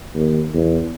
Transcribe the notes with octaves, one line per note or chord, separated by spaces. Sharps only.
D#2
E2